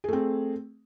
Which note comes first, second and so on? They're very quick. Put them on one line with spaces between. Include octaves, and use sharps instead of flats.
G#4 A3 C4